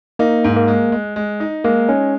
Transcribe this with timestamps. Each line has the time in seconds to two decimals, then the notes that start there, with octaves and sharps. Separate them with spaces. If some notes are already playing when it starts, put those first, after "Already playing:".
0.19 A#3 D#4
0.44 G#2
0.56 A#3
0.68 G#3
0.92 G#3
1.16 G#3
1.40 D#4
1.64 G#3 A#3
1.88 C#4 D#4